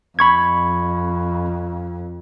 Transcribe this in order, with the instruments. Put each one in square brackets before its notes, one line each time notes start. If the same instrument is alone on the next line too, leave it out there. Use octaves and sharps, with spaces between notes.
[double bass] F2 [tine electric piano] B5 C#6 G#6